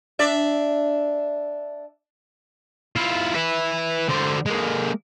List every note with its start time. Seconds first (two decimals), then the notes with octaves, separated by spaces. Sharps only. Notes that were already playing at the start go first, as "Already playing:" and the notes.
0.19 D4 D5 E5
2.96 E4 F4
3.35 B4 E5
4.09 D3 C5
4.46 G#3 A#3